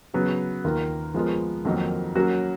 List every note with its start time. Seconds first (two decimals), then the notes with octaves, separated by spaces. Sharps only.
0.14 C#3 F#3 B3
0.64 D#2 D#3 A#3 F4 A#4
1.14 F3 G#3 B3 F4 A#4
1.65 F2 D#3 F#3 A#3 D#4
2.15 F#3 A#3 C#4 F#4